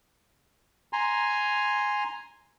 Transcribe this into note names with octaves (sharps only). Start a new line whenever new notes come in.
G#5 A#5 C6